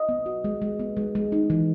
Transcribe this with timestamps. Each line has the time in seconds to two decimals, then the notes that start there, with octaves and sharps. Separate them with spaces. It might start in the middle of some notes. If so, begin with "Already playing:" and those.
Already playing: D#5
0.09 B3
0.26 F#4
0.44 G#3
0.62 G#3
0.80 B3
0.97 G#3
1.15 G#3
1.32 D#4
1.50 E3